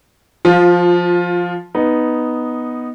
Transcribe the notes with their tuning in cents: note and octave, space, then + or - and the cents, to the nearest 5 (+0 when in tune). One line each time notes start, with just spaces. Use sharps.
F3 +0 F4 +20
B3 +0 D#4 +0